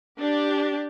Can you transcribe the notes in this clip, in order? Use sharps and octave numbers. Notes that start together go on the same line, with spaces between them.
D4 G4